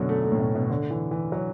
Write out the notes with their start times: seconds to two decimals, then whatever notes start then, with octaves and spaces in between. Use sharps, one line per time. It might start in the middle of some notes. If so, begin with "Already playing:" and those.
Already playing: F#2 B2 D3 F#3
0.09 A3
0.24 A3
0.32 A2
0.40 B2
0.55 B2
0.70 D3
0.90 E3
1.11 E3
1.32 F#3